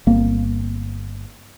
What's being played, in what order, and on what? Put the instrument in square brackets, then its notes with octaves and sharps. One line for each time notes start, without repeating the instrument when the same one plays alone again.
[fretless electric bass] G1 A#3 C4